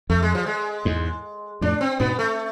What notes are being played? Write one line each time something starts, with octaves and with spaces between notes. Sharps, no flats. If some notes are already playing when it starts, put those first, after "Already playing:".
F2 A3
G#3
F3
G#3
E2 G#2
F2 A2 D4
C4
G#2 B2 B3
A3